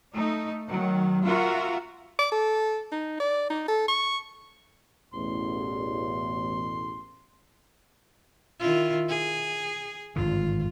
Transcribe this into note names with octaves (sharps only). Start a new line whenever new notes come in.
A3 D#4
D#3 F#3
F4 F#4 A#4 E5
D6
A4
D#4
D5
D#4
A4
C#6
A1 E2 B2 C6
D#3 E4 F4
G#4
G#1 G2 D3 F4